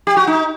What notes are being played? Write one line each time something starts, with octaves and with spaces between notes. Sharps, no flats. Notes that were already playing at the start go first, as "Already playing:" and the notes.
G4
F#4
D#4